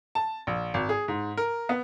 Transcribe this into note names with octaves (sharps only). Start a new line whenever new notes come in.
A5
A#1
G#1
G#4
G#2
A#4
B3